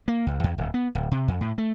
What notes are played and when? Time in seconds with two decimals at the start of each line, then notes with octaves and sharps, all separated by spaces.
0.08 A#3
0.27 C#2
0.44 E2
0.58 D1
0.74 B3
0.95 D1
1.11 C3
1.28 F2
1.41 A2
1.58 A3